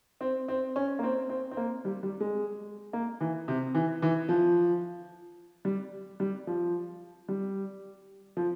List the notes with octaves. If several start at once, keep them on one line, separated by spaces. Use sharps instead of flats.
C4
C4
C#4
A#3
C4
C4
C4
A#3
G3
G3
G#3
A#3
E3
C3
E3
E3
F3
G3
G3
F3
G3
F3